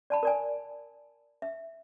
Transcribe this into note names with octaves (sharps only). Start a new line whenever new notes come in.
D5 A5 B5
A#4 D5 G#5
E5